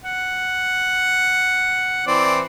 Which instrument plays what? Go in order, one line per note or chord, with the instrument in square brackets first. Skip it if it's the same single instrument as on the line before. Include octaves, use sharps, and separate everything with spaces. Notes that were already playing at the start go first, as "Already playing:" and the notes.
[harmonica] F#5
E3 C4 D5